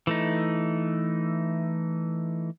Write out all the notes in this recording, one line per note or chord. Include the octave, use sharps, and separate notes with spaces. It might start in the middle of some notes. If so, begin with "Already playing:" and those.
E3 A3 D#4